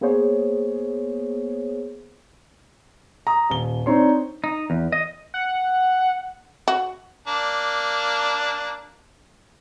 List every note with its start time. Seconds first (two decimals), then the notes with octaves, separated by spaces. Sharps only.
0.01 A#3 B3 G#4 C5 C#5
3.27 A#5 D#6
3.50 D#1 G7
3.86 C4 D4 D#4 C#5 C6
4.44 D#4
4.70 E2
4.92 D#5
5.34 F#5
6.68 F#4
7.28 A#3 D4